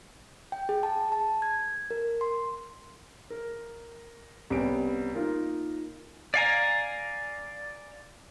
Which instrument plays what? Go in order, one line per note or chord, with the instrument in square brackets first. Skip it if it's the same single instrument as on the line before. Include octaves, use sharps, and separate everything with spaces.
[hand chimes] G5
G#4
A5
A5
G#6
A#4
C6
[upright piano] A#4
C2 B3 C#4 D7
A#3 D#4 F4 A#4
[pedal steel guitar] D5 F5 G#5 A#5